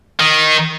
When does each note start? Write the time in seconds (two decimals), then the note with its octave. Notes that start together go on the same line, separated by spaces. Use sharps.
0.20 D#3